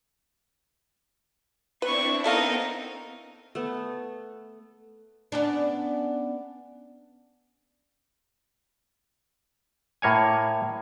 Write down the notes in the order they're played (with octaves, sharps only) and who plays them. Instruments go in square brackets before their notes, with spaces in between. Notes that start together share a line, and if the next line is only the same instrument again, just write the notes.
[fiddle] B3 C#6 [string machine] C4 D4 E4 [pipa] B4
[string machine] B3 C4 A#4 [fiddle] D#4 D#5 [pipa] E4 A4 F5
[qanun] A3 B3
[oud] B3 C#4 D4
[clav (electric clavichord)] A2 A#3 C#5 G#5